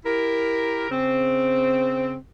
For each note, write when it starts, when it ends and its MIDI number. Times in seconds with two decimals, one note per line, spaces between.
0.05 0.87 64
0.05 0.87 67
0.05 0.87 70
0.90 2.15 49
0.90 2.15 60